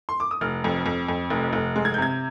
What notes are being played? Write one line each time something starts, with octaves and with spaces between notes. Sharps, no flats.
C6
D6
D#6
F1 F6
F2
F2
F2
F1
F1
G#3
G#6
G6
C3 G#6